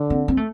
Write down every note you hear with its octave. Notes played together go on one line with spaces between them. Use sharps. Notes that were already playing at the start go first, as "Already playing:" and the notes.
Already playing: D3
C4
C4
A3